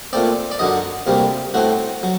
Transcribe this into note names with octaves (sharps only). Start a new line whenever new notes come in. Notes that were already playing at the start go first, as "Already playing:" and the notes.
A#2 A3 C4 D5
D5
F#2 D3 F#3 D#5
D2 C3 G3 A#3
A2 A3 C4 F#4
F#3